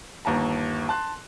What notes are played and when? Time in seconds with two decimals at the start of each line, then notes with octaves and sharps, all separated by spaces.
0.25 G1 D#2 A5 A#5
0.89 A5 C6 F#6